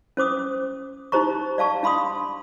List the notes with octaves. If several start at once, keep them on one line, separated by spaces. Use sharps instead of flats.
C#4 C5 D6 D#6
D#4 G4 C5 A#5 C#6
D5 F5 A5 C#6
D4 F5 B5 C6 D#6